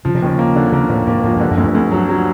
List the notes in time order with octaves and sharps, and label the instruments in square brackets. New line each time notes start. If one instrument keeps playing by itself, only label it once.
[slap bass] C#3 [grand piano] F3
[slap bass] C3
[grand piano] D#2 [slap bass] C#3
[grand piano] A#3
D3
[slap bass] C#3 [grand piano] A#3
[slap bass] A2 [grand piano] A#3
[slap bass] G#2 [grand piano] A#3
[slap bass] G#2 [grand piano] F3
[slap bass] G2 [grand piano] D3
[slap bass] F#2
[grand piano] D2
[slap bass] G2
[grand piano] D2
F#3
F#3